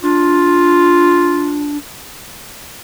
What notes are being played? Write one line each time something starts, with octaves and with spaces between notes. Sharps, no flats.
D4 F4